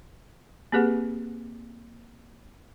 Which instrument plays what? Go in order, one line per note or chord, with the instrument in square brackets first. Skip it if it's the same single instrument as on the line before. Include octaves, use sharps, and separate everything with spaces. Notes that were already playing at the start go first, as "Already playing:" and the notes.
[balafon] A#3 C4 G4 G#4 B4 F#5